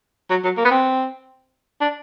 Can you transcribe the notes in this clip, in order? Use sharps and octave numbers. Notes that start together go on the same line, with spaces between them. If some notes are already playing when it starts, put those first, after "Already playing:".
F#3
F#3
A#3
B3
C4
D4